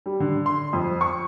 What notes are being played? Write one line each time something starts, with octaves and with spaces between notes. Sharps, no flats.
G3
D3
C6
F2
C#6